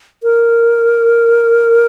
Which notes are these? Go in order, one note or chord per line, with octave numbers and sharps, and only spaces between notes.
A#4